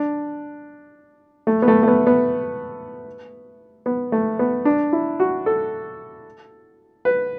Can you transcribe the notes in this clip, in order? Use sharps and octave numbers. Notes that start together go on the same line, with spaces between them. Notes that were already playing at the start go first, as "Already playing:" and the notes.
Already playing: D4
A3
B3
A3
A3
B3
B3
B3
A3
B3
D4
E4
F#4
A4
B4